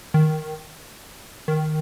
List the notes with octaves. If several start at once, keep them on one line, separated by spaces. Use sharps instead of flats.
D#3
D#3